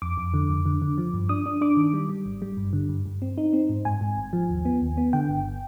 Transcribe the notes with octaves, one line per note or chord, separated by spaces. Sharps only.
F2 D6
F2
D3
F2
D3
D3
F3
G2
D4 D#6
D4
D4 D6
D#3
G3
G3
G#1
G3
G2
D3
G2
G2
C4
D#4
C4
G#2
G#2 G#5
G#2
G#1
F3
D#2
B3
D#2
B3
D3 G5
G1